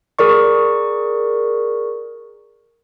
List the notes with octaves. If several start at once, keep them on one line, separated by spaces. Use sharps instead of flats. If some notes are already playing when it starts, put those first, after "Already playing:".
G#4 A#4 D5 C#6